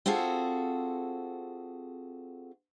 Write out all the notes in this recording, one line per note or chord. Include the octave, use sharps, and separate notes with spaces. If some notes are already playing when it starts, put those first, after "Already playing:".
C4 F4 F#4 G#4 A4